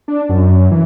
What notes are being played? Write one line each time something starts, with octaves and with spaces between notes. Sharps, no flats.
D4
F#2
E3